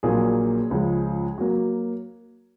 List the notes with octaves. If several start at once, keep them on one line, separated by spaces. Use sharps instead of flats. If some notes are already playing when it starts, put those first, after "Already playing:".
A#1 A#2 F#3 A#3 G#4
C#2 C#3 F3 G#3
F#3 A#3 F#4